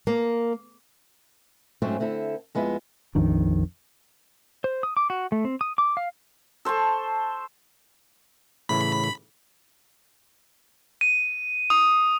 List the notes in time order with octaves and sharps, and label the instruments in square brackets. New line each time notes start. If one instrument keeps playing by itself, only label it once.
[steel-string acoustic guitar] A#3
G#2 F#3 A3 C4 C#4 F#4
D3 C4 E4 A4
F2 G#3 B3 E4
[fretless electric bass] A#1 F2 D#3 D4
[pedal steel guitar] C5
D#6
D6
F#4
A3
C4
D#6
D6
F5
[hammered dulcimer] A4 C5 A5 C#6
[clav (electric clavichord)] A2 C#3 E3 [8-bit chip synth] B5
[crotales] D#7
D#6